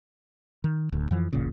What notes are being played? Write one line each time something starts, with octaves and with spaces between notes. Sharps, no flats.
D#3
D1 D2
F2 E3 F3
E1 A1 A#2 C#3